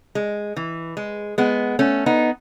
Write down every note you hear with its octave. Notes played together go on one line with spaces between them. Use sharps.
G#3
E3
G#3
G#3 B3
A3 C#4
B3 D#4